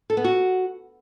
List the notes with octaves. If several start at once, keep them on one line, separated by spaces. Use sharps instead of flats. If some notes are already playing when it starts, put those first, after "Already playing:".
A4
B3
F#4